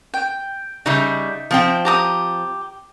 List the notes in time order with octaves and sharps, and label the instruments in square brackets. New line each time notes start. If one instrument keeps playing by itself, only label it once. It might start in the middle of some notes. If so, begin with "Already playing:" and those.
[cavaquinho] G5
[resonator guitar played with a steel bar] C#3 G3 [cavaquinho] D#4 E5
[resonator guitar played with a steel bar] F3 C4 G5
[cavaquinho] G4 A#5 D#6